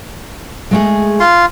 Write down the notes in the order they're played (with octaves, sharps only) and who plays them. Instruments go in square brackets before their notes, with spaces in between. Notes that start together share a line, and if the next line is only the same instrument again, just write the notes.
[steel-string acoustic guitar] G#3 A3 G#4
[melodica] F4 C6